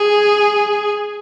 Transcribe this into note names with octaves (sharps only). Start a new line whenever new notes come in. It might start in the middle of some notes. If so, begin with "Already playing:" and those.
Already playing: G#4